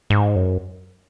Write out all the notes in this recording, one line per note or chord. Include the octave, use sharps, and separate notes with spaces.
G#2
F#2